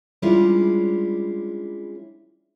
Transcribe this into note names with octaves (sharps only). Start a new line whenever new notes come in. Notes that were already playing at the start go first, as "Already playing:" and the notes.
G3 G#3 C#4 D4 E4 F4